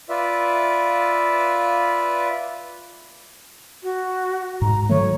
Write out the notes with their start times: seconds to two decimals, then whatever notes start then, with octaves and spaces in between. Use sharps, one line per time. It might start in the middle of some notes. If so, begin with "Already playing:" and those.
0.09 F4 B4 D5 E5
3.83 F#4
4.62 G#2 A#5
4.89 D#3 F#3 A3 C#5